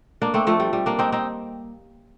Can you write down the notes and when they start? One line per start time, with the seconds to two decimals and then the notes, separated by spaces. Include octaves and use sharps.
0.22 A#3 D4
0.34 A3 C4
0.47 F3 A3
0.60 G3
0.73 G3
0.86 A#3 D4
0.99 C4 D#4
1.12 C4 D#4